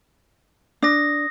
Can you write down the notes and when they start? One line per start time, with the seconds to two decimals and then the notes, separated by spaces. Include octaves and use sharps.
0.82 D4 D#6 A#6